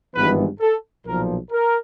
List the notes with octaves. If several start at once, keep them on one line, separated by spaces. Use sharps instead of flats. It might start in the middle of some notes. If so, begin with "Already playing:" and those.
G#1 G2 E3 G#3 B3 B4
A4
B1 A#2 F3 A#4
A#4